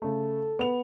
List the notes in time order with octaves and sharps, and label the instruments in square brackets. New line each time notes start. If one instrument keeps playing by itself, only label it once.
[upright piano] C#3 A3 [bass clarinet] A4
[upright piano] B3 F7